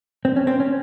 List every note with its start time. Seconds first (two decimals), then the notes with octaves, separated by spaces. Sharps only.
0.25 C4
0.36 C#4
0.47 C4
0.60 C#4